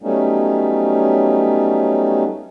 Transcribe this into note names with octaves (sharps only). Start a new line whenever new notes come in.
F#3 G3 A3 B3 C#4 D#4